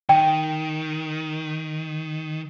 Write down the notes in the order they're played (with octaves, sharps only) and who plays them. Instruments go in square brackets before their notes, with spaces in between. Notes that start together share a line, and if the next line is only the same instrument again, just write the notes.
[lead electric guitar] D#3 [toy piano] G5